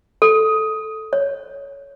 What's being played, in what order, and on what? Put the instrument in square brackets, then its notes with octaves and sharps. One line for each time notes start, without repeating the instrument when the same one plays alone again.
[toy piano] A4
C#5